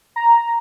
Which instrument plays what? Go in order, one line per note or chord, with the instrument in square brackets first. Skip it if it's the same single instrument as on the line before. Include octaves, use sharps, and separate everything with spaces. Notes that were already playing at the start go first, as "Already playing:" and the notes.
[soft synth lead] A#5